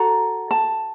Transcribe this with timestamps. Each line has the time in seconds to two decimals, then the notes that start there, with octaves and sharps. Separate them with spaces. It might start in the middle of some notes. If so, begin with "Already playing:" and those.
Already playing: F#4 A4 A#5
0.51 A5